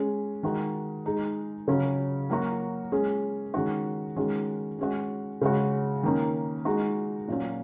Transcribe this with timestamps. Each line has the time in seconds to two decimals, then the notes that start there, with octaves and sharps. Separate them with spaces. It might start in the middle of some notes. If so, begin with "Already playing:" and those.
Already playing: G#3 C#4 G#4
0.43 D#3 G#3 F#4
1.05 G#3 D#4 G#4
1.67 C#3 F#3 C#4
2.30 F#3 A#3 F#4
2.92 G#3 C#4 G#4
3.54 D#3 G#3 C#4 F#4
4.16 D#3 G#3 C#4 F#4
4.79 G#3 C#4 F#4
5.41 C#3 G#3 F#4
6.03 D#3 A#3 C#4
6.65 G#3 D#4 F#4
7.28 A#2 F#3 C#4